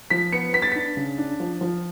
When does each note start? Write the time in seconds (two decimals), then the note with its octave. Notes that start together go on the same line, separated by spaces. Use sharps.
0.10 F3 B6
0.32 B3 C#7
0.53 B3 B6
0.62 A6
0.72 D4 B6
0.97 C#3
1.18 D4
1.40 F3
1.61 F3